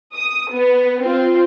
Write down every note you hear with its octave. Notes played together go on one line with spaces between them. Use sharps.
D#6
B3
C4 F4 C5